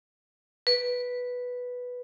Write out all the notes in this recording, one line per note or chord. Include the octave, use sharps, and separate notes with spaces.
B4